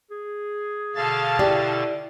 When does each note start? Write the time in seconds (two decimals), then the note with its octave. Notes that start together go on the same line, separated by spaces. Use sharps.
0.11 G#4
0.95 B2 D3 F5 A5 A6
1.39 E4 G4 D5